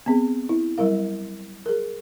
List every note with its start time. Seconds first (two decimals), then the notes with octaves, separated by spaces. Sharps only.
0.06 B3 C4 G#4
0.49 E4
0.78 F#3 G3 E4 A#4 F5
1.66 G#4 A#4